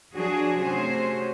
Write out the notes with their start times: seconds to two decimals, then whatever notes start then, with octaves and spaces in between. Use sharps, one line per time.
0.14 F3 F#3 D4 F#4 G#4
0.60 C3 A3 C#4 F#4 G#4 C5